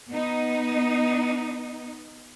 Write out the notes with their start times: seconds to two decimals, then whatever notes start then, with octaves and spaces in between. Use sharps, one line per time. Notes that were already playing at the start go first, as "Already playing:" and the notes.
0.12 B3 D#4